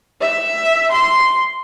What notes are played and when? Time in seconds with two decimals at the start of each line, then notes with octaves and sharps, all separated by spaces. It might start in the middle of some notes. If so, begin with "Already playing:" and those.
0.22 E5
0.92 C6